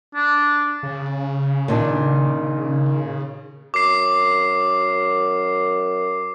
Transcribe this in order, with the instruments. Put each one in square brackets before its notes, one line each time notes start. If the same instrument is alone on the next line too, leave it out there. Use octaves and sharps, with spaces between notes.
[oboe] D4
[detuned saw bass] C#3
[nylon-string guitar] A#2 D#3 D4
[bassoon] F#2 [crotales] D6 C7